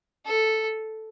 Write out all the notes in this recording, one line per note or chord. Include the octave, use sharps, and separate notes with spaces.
A4